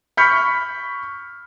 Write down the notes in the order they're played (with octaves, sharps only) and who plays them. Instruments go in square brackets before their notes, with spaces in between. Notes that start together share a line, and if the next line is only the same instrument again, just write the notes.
[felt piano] B5 C#6 F6 G6 B6 C#7